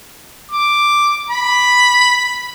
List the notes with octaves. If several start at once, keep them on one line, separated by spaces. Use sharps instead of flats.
D6
B5